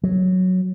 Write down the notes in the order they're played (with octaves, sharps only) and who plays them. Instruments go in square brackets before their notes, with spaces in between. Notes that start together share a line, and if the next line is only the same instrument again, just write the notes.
[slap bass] F#3